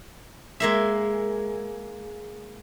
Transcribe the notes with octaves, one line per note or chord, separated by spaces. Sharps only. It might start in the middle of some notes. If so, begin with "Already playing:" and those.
G#3 A#3 E5